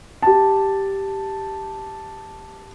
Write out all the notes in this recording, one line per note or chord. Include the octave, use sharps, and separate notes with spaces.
G4 A5